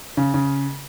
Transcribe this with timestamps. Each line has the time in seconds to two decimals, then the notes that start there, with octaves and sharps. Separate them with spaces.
0.17 C#3
0.34 C#3